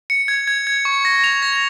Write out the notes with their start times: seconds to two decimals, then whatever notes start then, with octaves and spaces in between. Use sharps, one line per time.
0.10 C#7
0.28 G#6
0.48 G#6
0.67 G#6
0.85 C#6
1.05 A#6
1.24 F7
1.42 A#6